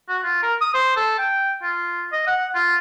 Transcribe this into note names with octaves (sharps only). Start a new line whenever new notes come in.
F#4
F4
A#4
D#6
C5
A4
G5
F4
D#5
F#5
F4